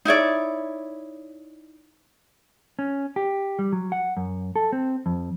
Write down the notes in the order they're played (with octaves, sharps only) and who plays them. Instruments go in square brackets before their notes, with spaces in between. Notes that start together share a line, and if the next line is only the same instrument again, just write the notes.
[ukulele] D#4 E4 C#5 D5
[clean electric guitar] C#4
G4
G3
F#3
F#5
F#2
A4
C4
F2